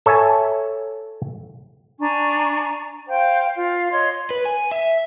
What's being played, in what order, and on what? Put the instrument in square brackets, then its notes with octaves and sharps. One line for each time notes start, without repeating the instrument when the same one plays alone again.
[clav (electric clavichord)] A4 C#5 E5 G#5 A5
[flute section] D4 G#5 A#5 C#6
C5 F5 G5
F4
C#5 D#5 C6
[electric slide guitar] B4
G#5
E5